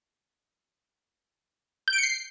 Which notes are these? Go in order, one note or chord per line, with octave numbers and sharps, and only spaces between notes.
G6
D7
C#7
C7